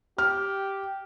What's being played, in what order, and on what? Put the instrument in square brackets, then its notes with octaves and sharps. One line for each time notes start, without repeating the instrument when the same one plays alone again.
[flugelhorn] G4 [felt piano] F6